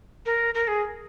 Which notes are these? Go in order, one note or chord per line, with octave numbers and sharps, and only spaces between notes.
A#4
A#4
G#4